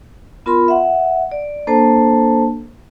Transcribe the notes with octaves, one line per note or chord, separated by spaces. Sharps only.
B3 F4 A#4 B5 C6
E5 F#5
D5
A#3 D4 A4 C5 A5